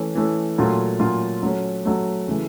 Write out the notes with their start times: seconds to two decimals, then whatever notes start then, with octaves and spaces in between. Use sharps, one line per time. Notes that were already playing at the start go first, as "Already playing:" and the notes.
Already playing: E3 A3 C#4
0.15 E3 A3 C#4
0.58 A#2 F#3 A3 C#4 F4
1.00 A#2 F#3 A3 C#4 F4
1.43 F#3 A3 C#4
1.85 F#3 A3 C#4
2.27 C#3 E3 A3